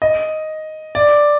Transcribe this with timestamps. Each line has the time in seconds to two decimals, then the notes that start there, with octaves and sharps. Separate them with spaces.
0.02 D#5
0.95 D5